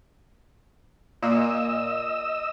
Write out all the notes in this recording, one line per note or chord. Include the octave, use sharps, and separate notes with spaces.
A#2 A#3 D#5 E6